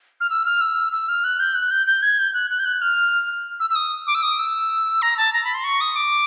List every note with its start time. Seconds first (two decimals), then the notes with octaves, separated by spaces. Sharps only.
0.21 F6
0.30 E6
0.45 F6
0.61 E6
0.93 E6
1.09 F6
1.24 F#6
1.40 G6
1.55 F#6
1.71 G6
1.87 G6
2.02 G#6
2.19 G6
2.34 F#6
2.50 F#6
2.59 G6
2.65 F#6
2.82 F6
3.60 E6
3.70 E6
3.75 D#6
4.07 D6
4.15 E6
4.23 D#6
4.39 E6
5.02 A#5
5.17 A5
5.33 A#5
5.44 B5
5.54 C6
5.64 C#6
5.81 D#6
5.96 D6